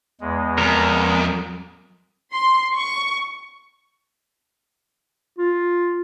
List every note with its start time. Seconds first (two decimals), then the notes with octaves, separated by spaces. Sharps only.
0.21 E2 G#3
0.58 F2 A#4
2.33 C6
2.74 C#6
5.39 F4